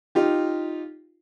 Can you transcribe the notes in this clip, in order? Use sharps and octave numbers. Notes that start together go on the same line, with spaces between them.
D#4 F4 G4